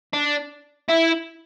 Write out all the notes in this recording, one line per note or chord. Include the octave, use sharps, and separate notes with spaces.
D4
E4